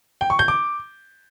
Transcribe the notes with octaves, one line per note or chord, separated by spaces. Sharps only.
G5
C#6
G6
D6